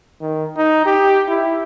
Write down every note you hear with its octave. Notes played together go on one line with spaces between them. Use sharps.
D#3
D#4
G4
E4